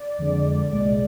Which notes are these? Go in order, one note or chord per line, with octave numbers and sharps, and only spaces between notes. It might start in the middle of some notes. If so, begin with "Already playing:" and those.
Already playing: D5
F2 D3 G#3
C2 A#2 G#3 D5